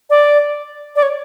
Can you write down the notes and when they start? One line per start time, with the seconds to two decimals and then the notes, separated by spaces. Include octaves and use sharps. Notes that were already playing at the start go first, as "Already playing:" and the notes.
0.10 D5
0.96 D5
1.03 C#5